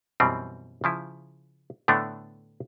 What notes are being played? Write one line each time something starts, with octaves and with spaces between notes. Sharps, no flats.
F#2 B2 E3 G3 C4
C#3 F3 E4
A2 D3 A3 B3 D4